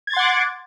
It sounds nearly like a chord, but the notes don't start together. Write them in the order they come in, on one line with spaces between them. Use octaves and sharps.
G#6 A6 C6 F#5 D6